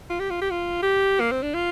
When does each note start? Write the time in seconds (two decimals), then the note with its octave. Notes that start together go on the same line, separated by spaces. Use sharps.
0.10 F4
0.19 G4
0.30 F4
0.42 G4
0.51 F4
0.82 G4
1.20 A#3
1.31 C4
1.42 D4
1.54 F4